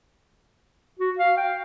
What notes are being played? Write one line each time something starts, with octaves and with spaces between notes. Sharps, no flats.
F#4
F5
G5